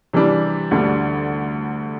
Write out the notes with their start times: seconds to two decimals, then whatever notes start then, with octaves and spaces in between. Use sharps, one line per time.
0.13 C3 E3 G3 D4
0.71 D2 D3 G3 D4